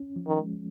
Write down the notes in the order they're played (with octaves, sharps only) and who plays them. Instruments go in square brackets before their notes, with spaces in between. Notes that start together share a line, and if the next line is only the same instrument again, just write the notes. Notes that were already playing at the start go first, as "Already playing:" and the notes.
Already playing: [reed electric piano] C#4
F3
[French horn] D#3
[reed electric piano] G#3